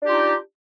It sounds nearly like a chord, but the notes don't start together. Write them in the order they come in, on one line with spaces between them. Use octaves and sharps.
D4 G4 F4 D#4